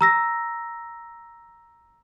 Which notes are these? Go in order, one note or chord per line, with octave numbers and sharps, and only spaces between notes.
A#5 E6 A#6